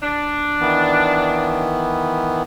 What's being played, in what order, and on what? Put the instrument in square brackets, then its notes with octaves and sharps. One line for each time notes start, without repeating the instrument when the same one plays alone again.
[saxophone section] D4
[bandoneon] D#3 E3 B3